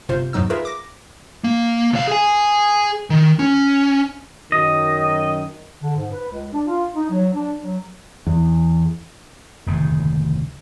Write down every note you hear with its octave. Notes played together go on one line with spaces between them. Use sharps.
G1 C3 F4 C5
E2 G#2 F#3 D#4 E6
F4 G#4 A#4 B4 E5
D6 A#6
A#3
C2 F5
G#4 G#5
D#3
C#4
F#2 D#3 D#5
D3
G#2
B4
C#2
D4
F4
D#4
F#3
D4
F#3
E2
F1 D2 G#2 D#3